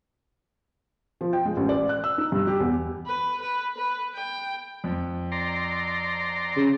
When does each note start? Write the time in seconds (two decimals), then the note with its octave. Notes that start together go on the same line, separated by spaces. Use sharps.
1.21 F3
1.33 G5
1.45 G#3
1.57 A1
1.69 D5
1.89 F#6
2.04 E6
2.18 D#4
2.32 G2
2.47 G4
2.60 E2
3.06 B4
3.42 B4
3.77 B4
4.14 G5
4.84 F2
5.32 D5 A#5 C6
6.56 C#3